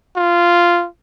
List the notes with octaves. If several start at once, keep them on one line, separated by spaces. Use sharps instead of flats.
F4